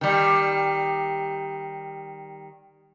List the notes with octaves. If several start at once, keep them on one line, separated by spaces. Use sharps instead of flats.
D#3 G3